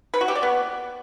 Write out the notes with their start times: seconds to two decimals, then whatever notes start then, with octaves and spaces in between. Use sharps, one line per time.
0.14 B4
0.21 F#4
0.28 G4
0.35 D5
0.43 B3